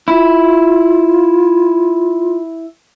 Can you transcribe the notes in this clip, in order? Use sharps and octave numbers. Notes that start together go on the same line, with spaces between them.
E4 F4